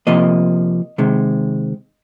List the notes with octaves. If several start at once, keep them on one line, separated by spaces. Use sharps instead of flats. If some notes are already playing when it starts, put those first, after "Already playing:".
C3 F3 A#3 D#5
C3 D#3 G#3